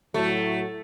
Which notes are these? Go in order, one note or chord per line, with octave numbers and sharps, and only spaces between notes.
A2 F#3 A3 F#4